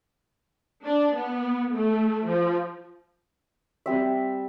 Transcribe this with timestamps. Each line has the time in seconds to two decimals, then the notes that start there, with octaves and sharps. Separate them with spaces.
0.85 D4
1.15 B3
1.74 A3
2.28 F3
3.86 G3 C4 E5